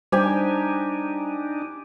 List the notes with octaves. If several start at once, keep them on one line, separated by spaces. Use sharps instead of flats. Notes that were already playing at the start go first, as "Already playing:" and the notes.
G3 D4 D#4 G4 C5 G#5